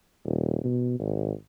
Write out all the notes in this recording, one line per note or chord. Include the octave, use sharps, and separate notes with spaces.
D#1
B2
G#1